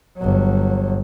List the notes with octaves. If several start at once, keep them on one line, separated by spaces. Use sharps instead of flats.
G1 F#3